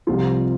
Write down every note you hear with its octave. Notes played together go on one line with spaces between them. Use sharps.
C2 C3 F3 F4